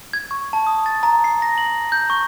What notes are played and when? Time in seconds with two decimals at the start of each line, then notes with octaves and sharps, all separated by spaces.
0.13 G#6
0.31 C#6
0.53 A5
0.67 D#6
0.86 A6
1.03 A#5
1.24 C7
1.42 A#6
1.58 F#7
1.92 G6
2.10 C#6